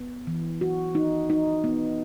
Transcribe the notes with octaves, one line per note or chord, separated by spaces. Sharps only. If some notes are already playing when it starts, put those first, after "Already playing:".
Already playing: B3
E3
F#4
D#4
D#4
B3